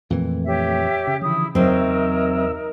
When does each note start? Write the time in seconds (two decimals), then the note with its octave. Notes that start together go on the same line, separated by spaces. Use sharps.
0.10 F2 A#2 E3 A3
0.45 G4 C#5 E5
1.07 C#3
1.22 D3 E3 F3 E4 D#6
1.55 E2 F#3 C4 D#4 A#4 E5 E6